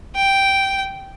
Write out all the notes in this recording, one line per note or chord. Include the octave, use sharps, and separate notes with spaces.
G5